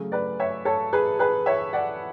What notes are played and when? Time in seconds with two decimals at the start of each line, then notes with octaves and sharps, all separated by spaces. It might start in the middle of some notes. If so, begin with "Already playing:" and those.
Already playing: C#3 F#3 A3 G#4
0.12 B4 D5
0.40 C#5 E5
0.65 A4 C#5
0.93 G#4 B4
1.19 G#4 B4
1.46 C#5 E5
1.73 D5 F#5